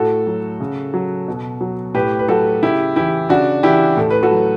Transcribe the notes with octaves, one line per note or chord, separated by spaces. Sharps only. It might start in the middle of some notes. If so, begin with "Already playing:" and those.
Already playing: A2 F#4 A4
F#3
C#3
F#3
B2
F#3
A2 G4 B4
B4
F#3 F#4 A4
C#3 E4 G4
E3 E4 G4
C#3 D4 F#4
E3 E4 G4
A2 A4
B4
F#4 A4
F#3